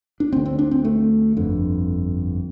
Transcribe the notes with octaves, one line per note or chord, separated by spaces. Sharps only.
D4
D2 D3 C4
C4
D4
C4
A3
G1 F2 D3